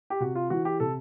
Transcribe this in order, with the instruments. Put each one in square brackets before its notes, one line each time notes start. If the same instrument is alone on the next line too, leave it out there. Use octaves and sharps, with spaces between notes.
[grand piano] G4
C3 F#4
F4
E3 F#4
G4
C3 A4